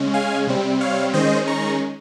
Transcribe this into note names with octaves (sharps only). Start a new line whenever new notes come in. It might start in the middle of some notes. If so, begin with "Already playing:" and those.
Already playing: C#3 G#3 C#4
F5 G#5
C3 G3 C4
C#5 F5
D#3 G#3 C#4 C5 D#5
A#5 C#6